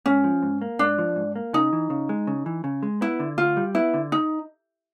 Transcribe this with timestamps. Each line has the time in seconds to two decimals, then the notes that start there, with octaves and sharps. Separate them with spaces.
0.06 G#2 C#4
0.24 F3
0.43 G#2
0.61 A#3
0.79 G#2 D4
0.98 F3
1.16 G#2
1.36 A#3
1.53 C#3 D#4
1.73 E3
1.90 C#3
2.09 G#3
2.27 C#3
2.46 E3
2.64 C#3
2.83 G#3
3.01 B3 E4
3.20 D3
3.38 D2 F4
3.57 G3
3.75 B3 E4
3.94 D3
4.12 D#4